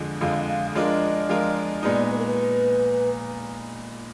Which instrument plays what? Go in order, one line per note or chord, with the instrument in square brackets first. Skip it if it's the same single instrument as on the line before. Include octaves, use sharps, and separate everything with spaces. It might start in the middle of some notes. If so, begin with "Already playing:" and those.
Already playing: [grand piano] F2 D3 F3 G#3
[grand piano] F2 D3 F3 G#3 [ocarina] F5
[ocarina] F5
[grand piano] F3 G#3 D4 F4 A#4 [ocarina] D#5
[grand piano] F3 G#3 D4 F4 A#4
[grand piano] A#2 G#3 B3 D#4 [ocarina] D5
[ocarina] B4
A#4
B4